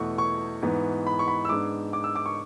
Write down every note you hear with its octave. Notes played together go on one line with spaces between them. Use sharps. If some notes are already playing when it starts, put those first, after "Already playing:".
Already playing: E2 B2 A3 C#6
C#6
G#2 E3 B3
B5
C#6
B5
E6
G#2 G#3 B3 D4 D6
D6
E6
D6
C#6